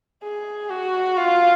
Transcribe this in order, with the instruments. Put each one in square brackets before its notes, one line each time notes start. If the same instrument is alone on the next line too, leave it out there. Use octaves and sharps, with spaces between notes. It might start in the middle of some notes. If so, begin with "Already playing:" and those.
[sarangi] G#4
F#4
F4